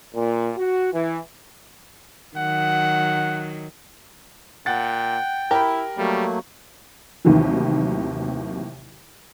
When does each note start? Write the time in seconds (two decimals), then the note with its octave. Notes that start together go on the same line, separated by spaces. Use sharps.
0.15 A#2
0.57 F#4
0.94 E3
2.37 D#3 F#3 F#5
4.66 A#2 F#5 G5 A6
5.51 E4 G4 A#4 B5
5.98 F#3 G3 A3 A#3
7.25 A1 D#2 C3 D#3 E3 F#3